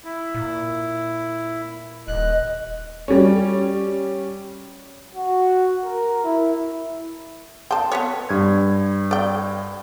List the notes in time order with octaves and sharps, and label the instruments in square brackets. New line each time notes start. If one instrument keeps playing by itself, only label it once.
[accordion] E4
[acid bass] A#2
[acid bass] D#1 [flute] D#5 [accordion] F#6
[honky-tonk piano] G3 C#4
[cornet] F#4
A#4
E4
[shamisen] G5 A5 [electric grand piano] C6
[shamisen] B3 B4 C#5
[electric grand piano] G2 G#6
[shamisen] D5 G5